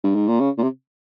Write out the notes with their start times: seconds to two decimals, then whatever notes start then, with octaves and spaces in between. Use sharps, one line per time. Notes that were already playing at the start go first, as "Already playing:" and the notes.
0.04 G2
0.15 G#2
0.28 A#2
0.40 C#3
0.58 A#2
0.63 C3